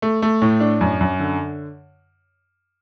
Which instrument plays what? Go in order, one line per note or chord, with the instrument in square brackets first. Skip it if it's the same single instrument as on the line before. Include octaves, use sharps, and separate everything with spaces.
[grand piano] A3
A3
A2
D4
F#2
F#2
D3